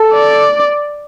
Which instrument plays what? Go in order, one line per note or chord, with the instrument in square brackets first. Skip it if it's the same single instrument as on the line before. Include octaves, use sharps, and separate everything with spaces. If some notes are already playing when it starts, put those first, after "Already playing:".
Already playing: [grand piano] A4
[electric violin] D5